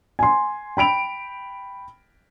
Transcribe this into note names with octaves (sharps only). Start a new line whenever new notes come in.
G#5 C6
G5 B5 D7 F7